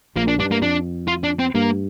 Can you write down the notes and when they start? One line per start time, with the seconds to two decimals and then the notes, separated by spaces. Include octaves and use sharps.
0.16 A#1 A#2 A#3
0.28 D4
0.39 G2 D4
0.51 A#3
0.62 F2 D4
1.08 F4
1.24 D4
1.39 C4
1.55 G2 A#3